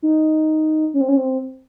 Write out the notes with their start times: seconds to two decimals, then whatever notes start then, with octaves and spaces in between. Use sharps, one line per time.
0.02 D#4
0.94 C#4
1.01 C4
1.08 C#4
1.17 C4